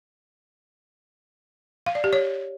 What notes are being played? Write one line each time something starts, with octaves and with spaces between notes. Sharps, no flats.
F5
D5
G4
C#5